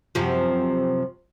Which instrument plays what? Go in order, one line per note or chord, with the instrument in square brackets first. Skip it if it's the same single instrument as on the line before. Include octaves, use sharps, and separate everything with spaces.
[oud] F#2 C3 F3